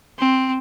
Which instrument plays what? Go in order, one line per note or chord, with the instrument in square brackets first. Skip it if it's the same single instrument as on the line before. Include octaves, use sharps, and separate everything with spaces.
[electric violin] C4